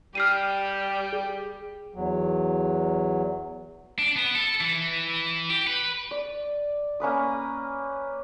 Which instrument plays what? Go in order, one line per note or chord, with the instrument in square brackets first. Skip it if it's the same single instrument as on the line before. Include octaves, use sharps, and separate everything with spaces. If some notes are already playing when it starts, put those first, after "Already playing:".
[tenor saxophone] G3 [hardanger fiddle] G4 [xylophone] F6 C7 D#7
[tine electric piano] G#4
[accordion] E2 F#3
[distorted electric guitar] D4
B3
A4
E3
G4
B4
[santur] D5
A#3 C#4 B4 D#6